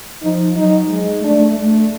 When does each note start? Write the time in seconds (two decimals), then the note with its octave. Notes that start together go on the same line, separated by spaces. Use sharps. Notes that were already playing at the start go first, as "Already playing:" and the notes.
0.23 F3 D#4
0.56 F#3 D#4
0.89 G#3
1.23 A3 D4
1.58 A3